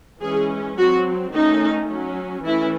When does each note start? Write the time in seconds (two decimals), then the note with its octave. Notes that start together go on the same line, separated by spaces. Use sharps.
0.22 E3 G#3 C#4 G#4
0.78 F#3 C4 F#4
1.33 D#3 A3 C#4 D#4
1.89 F#3 C#4
2.45 E3 A3 C#4 E4